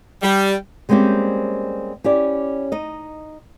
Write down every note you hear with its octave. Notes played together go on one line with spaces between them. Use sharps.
G3
G3 G#3 A#3 C4 C#4 G4
C#4 E4 G4 D5
D#4 D#5